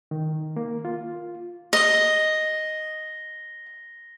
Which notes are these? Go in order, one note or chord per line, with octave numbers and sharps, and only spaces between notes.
D#3
A#3
F4
D#5 A#6 G7